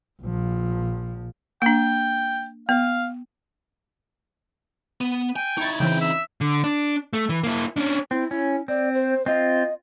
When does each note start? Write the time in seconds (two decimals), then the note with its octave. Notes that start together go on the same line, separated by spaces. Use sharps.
0.21 A#1 F3
1.62 A#3 D4 G5
2.69 B3 F5
5.01 B3 D#7
5.36 G5 G#5
5.58 D#4 E4 C#6 G#6 A6
5.80 C#3 E3 C4 G5
6.01 E5
6.41 D3
6.64 D4
7.13 A3
7.29 E3
7.43 A#3 E4
7.76 C#4 D4
8.11 C4 E4
8.31 C#4 E4
8.68 C4 D5
8.94 C5
9.26 C4 F4 D#5